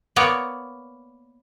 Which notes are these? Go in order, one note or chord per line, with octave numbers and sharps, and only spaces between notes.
A#3 B3 C#5 D5